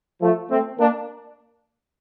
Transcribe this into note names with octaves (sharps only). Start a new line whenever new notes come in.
F3 A3
A3 C4
A#3 D4